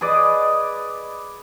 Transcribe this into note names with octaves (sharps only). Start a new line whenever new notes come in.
G#4 B4 D5 D#5